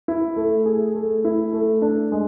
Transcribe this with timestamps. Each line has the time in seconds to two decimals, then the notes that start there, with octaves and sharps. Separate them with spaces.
0.08 E4
0.36 A3
0.66 G#4
0.95 A3
1.25 E4
1.53 A3
1.82 D4
2.12 G#3